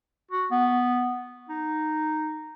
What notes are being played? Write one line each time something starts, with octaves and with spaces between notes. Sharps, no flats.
F#4
B3
D#4